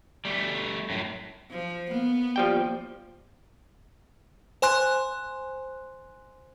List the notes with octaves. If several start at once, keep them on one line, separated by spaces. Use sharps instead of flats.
G3 A3
F#2 A2
F3
A#3 B3
F3 G3 G5
C5 G#5 C6 F#6